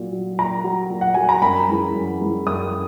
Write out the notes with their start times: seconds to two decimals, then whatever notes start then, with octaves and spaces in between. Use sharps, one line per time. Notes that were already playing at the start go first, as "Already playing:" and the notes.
Already playing: A#2 F#3
0.12 F#3
0.38 A#2 A#5
0.64 F#3
0.90 A#2
1.01 F#5
1.14 F#3 G#5
1.29 A#5
1.42 F#2 B5
1.69 E3 G#3
1.94 F#2
2.21 E3 G#3
2.46 F#2 D#6